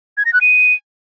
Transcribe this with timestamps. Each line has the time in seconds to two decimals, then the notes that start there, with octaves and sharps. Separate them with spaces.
0.17 G#6
0.25 A#6
0.33 F#6
0.41 D#7